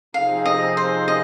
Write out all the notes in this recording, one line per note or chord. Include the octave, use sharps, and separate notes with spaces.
C3 F3 C4 D#4 G#4 F5
D#5
C5
D#5